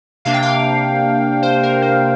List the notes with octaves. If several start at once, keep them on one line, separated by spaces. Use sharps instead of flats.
C3 A#3 D4 F5
G5
F5
C5
A#4
C5